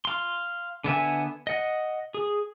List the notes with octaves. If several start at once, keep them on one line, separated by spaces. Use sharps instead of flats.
F5 C6
D3 B3 E5 G#5
D#5 F#5
G#4